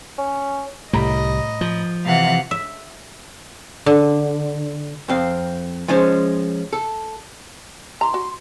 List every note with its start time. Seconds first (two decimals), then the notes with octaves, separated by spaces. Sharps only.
0.18 C#4
0.93 C2 A2 G3 D#5 A#5 B5
1.61 F3
2.05 C3 E3 F5 F#5
2.51 E5
3.86 D3
5.09 F2 C4 F5
5.88 F3 G#3 C#4 C5
6.73 A4
8.01 E3 A#5 C6
8.14 F#4